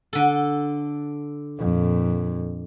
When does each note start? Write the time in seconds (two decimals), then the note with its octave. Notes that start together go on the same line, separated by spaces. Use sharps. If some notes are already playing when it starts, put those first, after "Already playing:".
0.13 D3 A4
1.59 F2 A#2